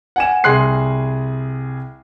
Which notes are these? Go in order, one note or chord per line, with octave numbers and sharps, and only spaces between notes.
F#5 G#5 E7
C2 G#4 C6 F#6 C7